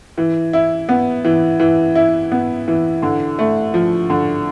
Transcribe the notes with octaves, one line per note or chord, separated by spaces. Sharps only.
E3
E4
B3
E3
E3
E4
B3
E3
D3
A3
F3
D3